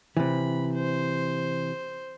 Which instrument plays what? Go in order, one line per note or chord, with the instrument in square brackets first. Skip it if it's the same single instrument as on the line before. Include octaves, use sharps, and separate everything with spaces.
[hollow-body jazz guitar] C3 E3 [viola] B5
[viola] C5